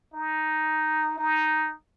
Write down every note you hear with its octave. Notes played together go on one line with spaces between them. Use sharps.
D#4
D#4